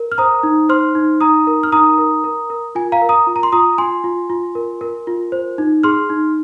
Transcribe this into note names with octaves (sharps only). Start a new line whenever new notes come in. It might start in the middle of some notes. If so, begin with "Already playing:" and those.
Already playing: A#4
F6
C5 A#5 D#6
D#4
C5 C6 F6
D#4
D#4 A#5 D#6
A#4
F6
D#4 A#5 D#6
A#4
A#4
A#4
F4 G#5
F5 A#5
A#4
A#5 D#6
F4
A#5
C6
F4 A#5 D#6
F4 G#5 C6
F4
F4
A#4
A#4
F4
C5
D#4
G#4 C6 F6
D#4